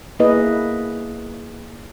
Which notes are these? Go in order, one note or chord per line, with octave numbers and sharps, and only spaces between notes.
A#3 B3 E4 G#4 B4 D#5